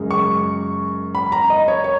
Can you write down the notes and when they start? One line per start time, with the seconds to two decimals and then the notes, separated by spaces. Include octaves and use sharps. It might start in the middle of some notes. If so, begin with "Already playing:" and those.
Already playing: F#2 C#3 G#3
0.11 C#6
1.15 B5
1.32 A#5
1.50 D#5
1.68 C#5
1.84 C#5